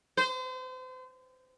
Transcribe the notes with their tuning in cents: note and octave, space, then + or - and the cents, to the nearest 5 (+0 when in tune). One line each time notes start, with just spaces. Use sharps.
C5 -35